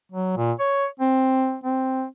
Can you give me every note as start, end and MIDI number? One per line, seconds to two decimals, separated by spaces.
0.12 0.33 54
0.37 0.52 46
0.59 0.86 73
1.00 1.57 60
1.64 2.05 60